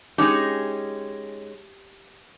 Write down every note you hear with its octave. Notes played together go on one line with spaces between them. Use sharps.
G#3 C#4 D#4 G4